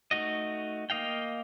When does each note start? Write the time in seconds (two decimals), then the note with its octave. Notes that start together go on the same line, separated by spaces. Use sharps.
0.11 A3 D#4 F#4 D#5
0.90 A#3 D#5 F5 G5